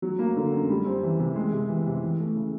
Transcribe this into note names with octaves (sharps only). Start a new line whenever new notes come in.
F#3
A#3
D3
F#2
G3
C4
E3
C3
G#3
C3
E3
C3
E3
A3
C#3